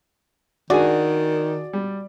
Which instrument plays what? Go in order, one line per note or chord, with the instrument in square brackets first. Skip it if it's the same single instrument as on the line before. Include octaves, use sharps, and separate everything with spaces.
[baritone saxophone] D#3 [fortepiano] D4 G#4 G#5 [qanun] F#4 [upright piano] D5
[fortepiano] G3